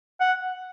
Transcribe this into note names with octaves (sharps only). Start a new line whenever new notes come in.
F#5